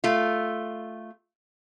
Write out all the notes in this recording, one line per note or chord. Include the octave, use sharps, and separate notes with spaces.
A3 F4